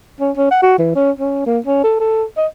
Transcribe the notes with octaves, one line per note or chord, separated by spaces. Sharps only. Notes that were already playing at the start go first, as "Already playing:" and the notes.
C#4
C#4
F#5
F#4
E3
C#4
C#4
A#3
C#4
A4
A4
D#5